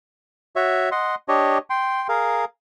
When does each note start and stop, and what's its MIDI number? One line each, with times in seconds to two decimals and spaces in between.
0.56 0.89 66
0.56 0.89 73
0.56 0.89 76
0.91 1.15 75
0.91 1.15 78
0.91 1.15 84
1.28 1.58 62
1.28 1.58 67
1.28 1.58 73
1.28 1.58 75
1.70 2.07 79
1.70 2.07 84
2.09 2.45 68
2.09 2.45 70
2.09 2.45 77